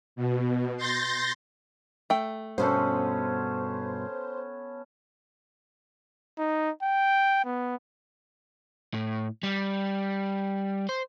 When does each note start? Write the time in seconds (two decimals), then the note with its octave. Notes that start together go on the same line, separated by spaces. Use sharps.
0.16 B2
0.77 C6 G6 A6 A#6
2.10 A3 G5
2.58 G2 B2 B3 C#4 A4 C5
6.38 D#4
6.83 G5
7.45 B3
8.94 A2
9.43 G3
10.89 C5